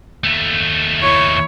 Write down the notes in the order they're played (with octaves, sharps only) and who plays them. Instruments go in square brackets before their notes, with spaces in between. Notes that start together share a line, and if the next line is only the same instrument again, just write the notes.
[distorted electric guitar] D#2 A3
[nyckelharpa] E4 C#5